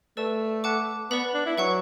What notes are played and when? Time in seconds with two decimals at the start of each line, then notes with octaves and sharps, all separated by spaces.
0.17 A3 B4 D5 A5 E6
0.64 F#5 A5 D6 F#6
1.10 B3 B4 D5 F#5 B5
1.34 D4
1.46 E4
1.57 F#3 B4 F#5 C#6